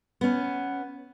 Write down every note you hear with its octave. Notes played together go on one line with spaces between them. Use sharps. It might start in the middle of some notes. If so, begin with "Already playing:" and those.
B3 C#4